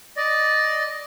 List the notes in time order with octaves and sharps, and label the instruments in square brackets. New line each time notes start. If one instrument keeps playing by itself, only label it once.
[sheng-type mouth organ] D5 D#5